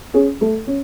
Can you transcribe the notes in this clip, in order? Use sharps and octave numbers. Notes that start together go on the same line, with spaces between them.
C#4 G#4
A3
C#4